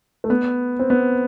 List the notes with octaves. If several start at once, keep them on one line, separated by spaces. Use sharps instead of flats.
A3
B3
C4
B3